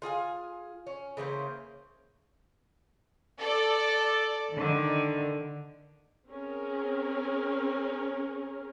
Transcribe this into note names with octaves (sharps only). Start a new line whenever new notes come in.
F4 G#4 F5 G#5
C#4
C#3 E3 A#3 C5
A4 D5
D3 D#3
C4 C#4 G#4 A#4